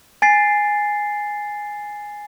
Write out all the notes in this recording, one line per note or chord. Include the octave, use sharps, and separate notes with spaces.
G#5 A6 C7